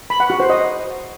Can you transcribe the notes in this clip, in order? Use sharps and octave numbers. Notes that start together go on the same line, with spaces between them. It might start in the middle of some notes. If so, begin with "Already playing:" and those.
B5
F#5
F#4
C5
D#5